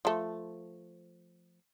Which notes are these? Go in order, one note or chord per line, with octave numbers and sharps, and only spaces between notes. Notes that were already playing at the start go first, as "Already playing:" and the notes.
F3 A3